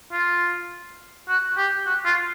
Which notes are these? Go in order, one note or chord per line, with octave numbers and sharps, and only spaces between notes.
F4
F#4
G4
F#4
F4